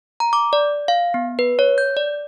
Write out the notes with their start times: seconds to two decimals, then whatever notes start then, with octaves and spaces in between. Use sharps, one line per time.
0.20 A#5
0.33 D6
0.53 D5
0.88 F5
1.14 B3
1.39 B4
1.59 C#5
1.78 G6
1.97 D5